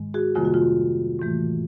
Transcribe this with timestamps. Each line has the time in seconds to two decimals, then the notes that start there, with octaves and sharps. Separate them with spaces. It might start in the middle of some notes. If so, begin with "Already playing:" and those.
Already playing: G#2 D#3 G#3
0.14 F#4 G#4
0.35 F2 C3 D#3 G3 A#3 F4
0.45 F#4
0.54 F4
1.19 A2 E3 A3